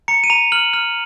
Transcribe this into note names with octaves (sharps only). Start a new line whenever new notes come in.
A#5 C#7
D#7
A#5 F7
F6 F#7
F6